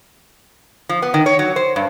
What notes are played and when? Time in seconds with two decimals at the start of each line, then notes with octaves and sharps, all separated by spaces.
0.89 F3
1.02 B3
1.14 D#3
1.26 C#5
1.39 F#3
1.56 C5
1.76 G2